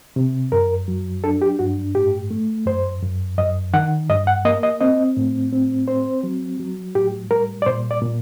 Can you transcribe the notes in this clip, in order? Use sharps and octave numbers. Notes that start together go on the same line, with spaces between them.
C3
F#2 A#4
F#3
D4 A4
G4
G2 F#4
A2 G4
A3
F#2 C5
F#2
F#2 D#5
D#3 F#5
G2 D#5
F#5
A#3 D#5
D#5
C4 D#5
A2
C4
C4 C5
F#3
F#3
A2 G4
G3 A#4
D5
A#2 C5
D5
A#2